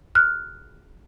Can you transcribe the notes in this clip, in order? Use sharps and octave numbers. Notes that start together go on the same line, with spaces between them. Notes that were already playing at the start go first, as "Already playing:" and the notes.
F6 F#6